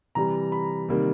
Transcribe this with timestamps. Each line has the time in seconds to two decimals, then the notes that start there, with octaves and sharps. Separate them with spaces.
0.15 C3 E3 G3 A#5
0.52 B5
0.88 C3 D#3 G3 A#3